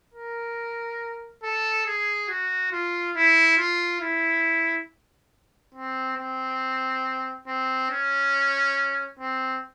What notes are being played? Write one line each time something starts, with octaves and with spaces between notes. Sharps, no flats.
A#4
A4
G#4
F#4
F4
E4
F4
E4
C4
C4
C4
C#4
C4